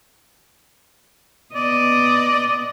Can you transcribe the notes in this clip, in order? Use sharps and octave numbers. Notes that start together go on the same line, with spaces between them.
B3 D5 D#5